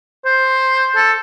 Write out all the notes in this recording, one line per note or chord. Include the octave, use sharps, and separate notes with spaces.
C5
A4